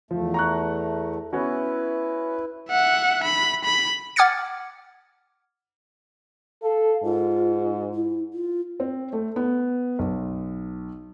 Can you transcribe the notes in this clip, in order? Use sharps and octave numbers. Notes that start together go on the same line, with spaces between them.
E2 F3 A3
A#5 C#6 F#6
B3 C#4 E4 F#4 B4
E5 F#5
B5
B5
F#5 D6 F6 G#6 A6 C#7
A4 F5
G#2 F4
E4
F4
C4
A3
B3
B1